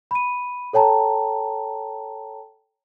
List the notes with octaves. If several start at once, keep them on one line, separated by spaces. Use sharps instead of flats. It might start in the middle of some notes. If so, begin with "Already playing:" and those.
B5 D#7
A4 C#5 G5 A5 A#5